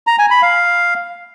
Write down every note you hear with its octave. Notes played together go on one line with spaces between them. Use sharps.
A#5
G#5
B5
F5